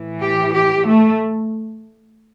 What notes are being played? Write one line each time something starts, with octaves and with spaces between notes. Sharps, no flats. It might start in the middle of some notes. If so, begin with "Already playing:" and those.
Already playing: A2 E3
G4
G4
A3